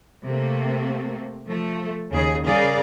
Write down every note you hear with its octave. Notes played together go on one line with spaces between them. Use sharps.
C3 A3 A#3
F3 A3
D#2 C#3 G#4
C#3 G3 G#4 A#4 D5 F5